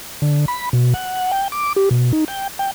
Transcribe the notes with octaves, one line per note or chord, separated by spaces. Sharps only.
D3
B5
B2
F#5
G5
D6
G4
B2
D#4
G5
G5